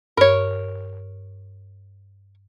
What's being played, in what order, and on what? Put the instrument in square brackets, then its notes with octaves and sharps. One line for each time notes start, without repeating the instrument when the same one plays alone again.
[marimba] G2 [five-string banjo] A#4 C#5